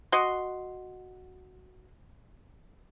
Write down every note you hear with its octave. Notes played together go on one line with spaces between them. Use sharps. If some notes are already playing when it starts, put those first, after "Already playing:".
F#4 D#5 C6